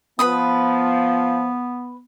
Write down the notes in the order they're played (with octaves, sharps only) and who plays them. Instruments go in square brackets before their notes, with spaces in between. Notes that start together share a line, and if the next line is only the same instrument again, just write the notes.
[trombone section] F3 [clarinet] B3 [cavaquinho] B4 B5 D#6